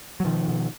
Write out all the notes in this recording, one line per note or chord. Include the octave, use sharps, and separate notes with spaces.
F#3
B2 D#3 F3
B2